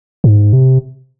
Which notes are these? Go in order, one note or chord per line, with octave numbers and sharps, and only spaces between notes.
G#2
C3